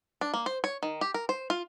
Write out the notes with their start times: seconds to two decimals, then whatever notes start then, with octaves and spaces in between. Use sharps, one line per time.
0.21 D4
0.34 A#3
0.46 C5
0.64 C#5
0.83 D#3
1.01 G4
1.14 A#4
1.29 C5
1.50 F4